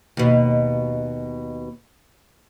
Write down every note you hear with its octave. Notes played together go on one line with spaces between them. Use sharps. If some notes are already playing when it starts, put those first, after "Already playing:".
D#2 B2